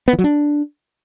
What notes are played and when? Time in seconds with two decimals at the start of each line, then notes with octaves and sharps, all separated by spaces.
0.08 B3
0.13 E3
0.19 F#3
0.24 D4